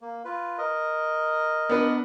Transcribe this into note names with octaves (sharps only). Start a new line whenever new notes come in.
A#3
F4 B4
A#4 D#5
B3 D4 B4